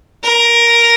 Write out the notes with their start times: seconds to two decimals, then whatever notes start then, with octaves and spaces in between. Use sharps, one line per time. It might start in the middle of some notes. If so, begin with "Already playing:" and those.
0.24 A#4